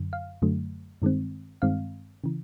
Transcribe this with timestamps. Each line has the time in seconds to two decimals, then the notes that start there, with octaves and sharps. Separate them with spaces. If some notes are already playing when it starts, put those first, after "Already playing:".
Already playing: F#2 D3 F#3
0.13 F5
0.42 F#2 D3 F#3 A3
1.02 G2 D#3 G#3 C4
1.62 G2 D#3 G#3 C4 F5
2.24 C#3 E3